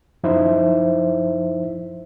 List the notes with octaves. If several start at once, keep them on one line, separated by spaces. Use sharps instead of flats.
F#2 F3 D#4 E4 C5 E5